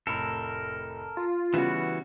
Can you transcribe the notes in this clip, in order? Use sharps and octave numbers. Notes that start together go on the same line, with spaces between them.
F1 A2 A4 A#4
F4
C#3 E3 G3 B3 F#4